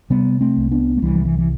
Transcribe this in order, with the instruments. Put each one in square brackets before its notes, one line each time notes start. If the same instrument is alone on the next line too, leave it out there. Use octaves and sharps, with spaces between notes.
[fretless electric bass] C3 G3 B3
A3 C4
C2
B3 D4
A3
C2 E3 G3
F3
E3
E3